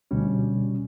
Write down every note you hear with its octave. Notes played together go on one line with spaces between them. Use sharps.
D2 B2 G3 C#4